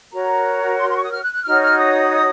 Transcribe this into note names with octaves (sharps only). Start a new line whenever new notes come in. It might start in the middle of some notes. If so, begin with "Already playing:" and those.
F#4 A#4 C#5 A#5
C6
C6
C#6
D#6
F6
F#6
F#6
D#4 F#4 C#5 F6
F6
D#6